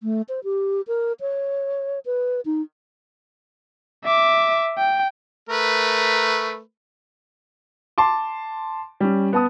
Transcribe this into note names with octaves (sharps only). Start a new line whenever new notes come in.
A3
C5
G4
A#4
C#5
B4
D#4
E5 D6
G5
A3 A#4 B4
A5 C6 D6
G3 C#4
B3 A5 D#6